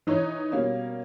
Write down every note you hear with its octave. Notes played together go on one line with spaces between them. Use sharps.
E3 D#4 C#5
B2 G3 A#3 C#4